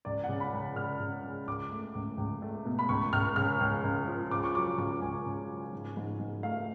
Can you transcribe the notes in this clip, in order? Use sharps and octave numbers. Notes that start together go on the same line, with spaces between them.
C#2 D5
F#5
C#3
B5
C#2
C#3 F6
C#3
G#3
C#2 D6
A3
C#2
C#2
A3
B2
B5
C#2 C#6
C#2 F6
C#3 F6
C#2
C#2
F3
C#3 D6
C#6
F#3 D6
C#2 D6
C#2 G#5
C#3
F#3
G#2
G#2
G#2
A3 F5